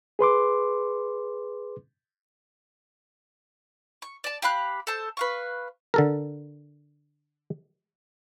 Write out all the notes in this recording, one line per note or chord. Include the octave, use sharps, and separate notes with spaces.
G#4 B4 C6 D6
C#6
D5 A5
G4 F5 B5 F#6
A4 C5 A5
B4 F5 C#6
D3 A4 A#4